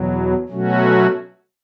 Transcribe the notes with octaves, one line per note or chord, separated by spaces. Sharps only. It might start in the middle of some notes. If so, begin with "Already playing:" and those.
Already playing: E2 B2 F#3
B2 F#3 A3 C#4 F#4